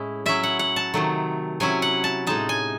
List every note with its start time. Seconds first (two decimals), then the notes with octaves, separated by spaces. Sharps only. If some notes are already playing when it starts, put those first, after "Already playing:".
Already playing: A2 G#3 C#4 E4
0.26 F#3 C#4 E4 E5
0.43 F#5
0.59 F#5
0.76 A5
0.94 C3 D#3 F#3 A3
1.60 C3 F#3 C#4 E4 G#5
1.82 F#5
2.04 A5
2.27 A2 G#3 D#4 A5
2.49 G#5